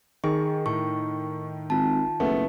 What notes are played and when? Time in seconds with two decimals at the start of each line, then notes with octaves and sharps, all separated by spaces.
0.24 D#3 G#4 C#6
0.66 A2 C#6
1.70 G#1 F4 A5
2.20 F#1 A3 B3